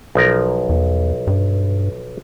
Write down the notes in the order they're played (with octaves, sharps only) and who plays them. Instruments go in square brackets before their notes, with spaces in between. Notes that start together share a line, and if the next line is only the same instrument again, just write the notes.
[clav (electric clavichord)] B1 F3 A#4
[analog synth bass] E2
G2